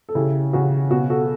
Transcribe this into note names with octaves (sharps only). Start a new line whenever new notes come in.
A4
C#3 E4 G4
C#3 F#4
B2 F#4
F#4 A4